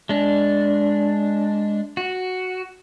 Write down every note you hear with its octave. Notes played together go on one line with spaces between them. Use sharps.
G#3 D4
F#4